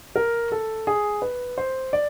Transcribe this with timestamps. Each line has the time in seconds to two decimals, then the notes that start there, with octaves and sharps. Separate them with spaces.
0.16 A#4
0.52 A4
0.87 G#4
1.22 B4
1.58 C5
1.93 D5